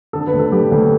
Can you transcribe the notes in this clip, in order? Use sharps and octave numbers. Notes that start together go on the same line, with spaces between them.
D3 A4
B4
D2
A4
G3 G4
D2